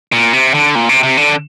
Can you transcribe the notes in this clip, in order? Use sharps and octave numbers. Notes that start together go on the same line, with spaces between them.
A#2
C3
D3
A#2
C3
C3
D3